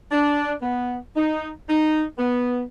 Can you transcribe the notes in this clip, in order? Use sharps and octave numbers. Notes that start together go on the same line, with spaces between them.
D4
B3
D#4
D#4
B3